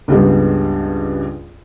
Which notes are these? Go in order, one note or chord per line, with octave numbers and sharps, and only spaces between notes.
C#2 G2 C#3 G3 G#3 B3